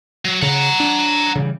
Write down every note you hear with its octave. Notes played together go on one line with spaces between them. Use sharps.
F#3
C#3 F#5 A#5
D4
C#3 E3 G3